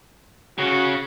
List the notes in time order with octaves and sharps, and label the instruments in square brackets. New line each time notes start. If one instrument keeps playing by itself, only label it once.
[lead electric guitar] C#3 [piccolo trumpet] F#4